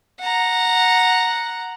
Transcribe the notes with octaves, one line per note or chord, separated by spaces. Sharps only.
F#5 A#5